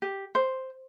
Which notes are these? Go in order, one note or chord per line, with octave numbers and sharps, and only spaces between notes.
G4
C5